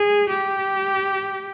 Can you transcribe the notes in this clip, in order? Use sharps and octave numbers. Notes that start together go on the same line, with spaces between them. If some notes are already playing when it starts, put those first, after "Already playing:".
Already playing: G#4
G4